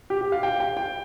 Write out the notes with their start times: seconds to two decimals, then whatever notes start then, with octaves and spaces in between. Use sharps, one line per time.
0.10 G4
0.21 G4
0.32 F5
0.43 G5
0.60 G5
0.77 G5